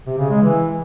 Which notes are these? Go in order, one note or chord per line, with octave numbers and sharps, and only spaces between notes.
C3
C#3
G#3
E3